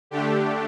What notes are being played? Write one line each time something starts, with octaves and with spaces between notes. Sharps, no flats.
D3 A3 D4 G4